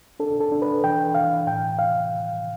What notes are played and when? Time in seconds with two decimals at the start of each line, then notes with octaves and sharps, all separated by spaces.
0.20 D4 A4
0.40 A4
0.52 D4
0.62 B4
0.84 E3 G5
1.15 E3 F5
1.47 A2 G5
1.79 F5